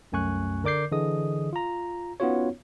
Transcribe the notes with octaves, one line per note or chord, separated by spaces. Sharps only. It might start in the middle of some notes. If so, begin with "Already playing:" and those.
C2 F#2 A3 G#5 C#6 F#6
D3 A#4 D5 D6 G6 C7
D3 E3 G#4 D#5 D#6
F4 A#5
B3 C#4 D#4 F4 F#4 C#5